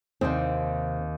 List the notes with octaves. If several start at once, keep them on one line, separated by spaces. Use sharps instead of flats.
D#2 C3 C4